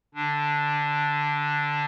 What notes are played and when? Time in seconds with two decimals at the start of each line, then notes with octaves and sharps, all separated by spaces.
0.14 D3 D4